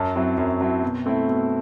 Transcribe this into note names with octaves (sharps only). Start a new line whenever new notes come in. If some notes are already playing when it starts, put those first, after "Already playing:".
Already playing: F#2 A5
F#3 C4 E4
F#2
F#3 C4 E4
B2
A3 C4 E4
B2